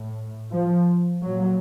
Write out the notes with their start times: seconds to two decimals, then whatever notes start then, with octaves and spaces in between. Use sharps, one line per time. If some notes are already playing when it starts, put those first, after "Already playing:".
Already playing: A2
0.52 F3
1.22 A#2 F#3